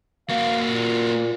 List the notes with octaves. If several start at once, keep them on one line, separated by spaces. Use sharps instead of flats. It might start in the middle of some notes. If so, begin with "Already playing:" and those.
A#3 F#4 F5
A#2